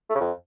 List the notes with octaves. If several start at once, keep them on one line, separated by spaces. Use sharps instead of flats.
A3
C#3
F2